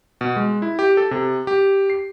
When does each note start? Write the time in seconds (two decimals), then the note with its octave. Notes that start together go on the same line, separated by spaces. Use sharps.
0.21 B2
0.36 G#3
0.62 E4
0.79 G4
0.97 A4
1.11 C3
1.47 G4
1.90 C7